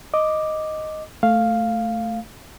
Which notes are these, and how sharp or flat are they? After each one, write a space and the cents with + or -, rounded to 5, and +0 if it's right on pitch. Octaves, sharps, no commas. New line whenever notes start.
D#5 +0 D6 +5
A3 +0 F5 +0